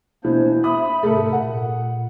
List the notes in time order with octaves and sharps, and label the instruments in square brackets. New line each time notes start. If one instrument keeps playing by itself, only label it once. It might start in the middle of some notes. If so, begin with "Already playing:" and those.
[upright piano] B2 E3 [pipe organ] A#3 D4 C5
[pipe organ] E5 B5 [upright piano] D#6
[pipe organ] G#2 C3 [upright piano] A3 A4 A#4
[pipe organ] A#2 [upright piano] F#5